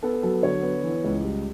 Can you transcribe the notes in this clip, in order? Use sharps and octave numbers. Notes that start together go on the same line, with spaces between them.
B3 A4
A4
F#3 A4
A4
D3 C#5
B3
E3
C#2
G3